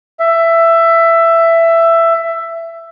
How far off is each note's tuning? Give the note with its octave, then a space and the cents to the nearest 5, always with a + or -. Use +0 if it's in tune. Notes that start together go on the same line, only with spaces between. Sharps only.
E5 +15